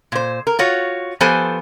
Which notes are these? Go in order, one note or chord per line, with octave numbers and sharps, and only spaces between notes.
A#2 C5
A#4
F4 F#4 C#5
F3 B3 G4 A4 C5 G#5